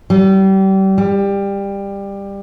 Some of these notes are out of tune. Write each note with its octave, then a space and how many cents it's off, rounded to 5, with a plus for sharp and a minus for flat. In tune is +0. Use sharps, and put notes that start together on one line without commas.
G3 -30
G3 +20